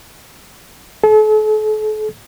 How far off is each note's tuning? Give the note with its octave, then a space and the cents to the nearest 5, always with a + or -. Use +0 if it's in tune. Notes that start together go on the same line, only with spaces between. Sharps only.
A4 -40